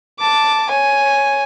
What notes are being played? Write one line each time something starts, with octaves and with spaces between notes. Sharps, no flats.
A5 D6
C#5 G#5